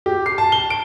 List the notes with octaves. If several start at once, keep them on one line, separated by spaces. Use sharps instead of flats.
G4
C7
A5
G7
D7